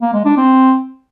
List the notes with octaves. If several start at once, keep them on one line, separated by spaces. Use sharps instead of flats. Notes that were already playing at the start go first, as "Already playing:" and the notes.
A#3
G#3
D4
C4